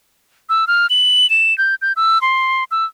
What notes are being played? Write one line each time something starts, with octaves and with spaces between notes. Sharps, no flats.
E6
F6
F#7
E7
G6
G6
E6
C6
E6